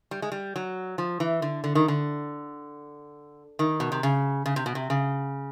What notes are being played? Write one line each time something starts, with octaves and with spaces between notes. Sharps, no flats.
G3
G#3
G3
F#3
F3
E3
D3
D3
D#3
D3
D#3
B2
C3
C#3
C#3
C3
B2
C3
C#3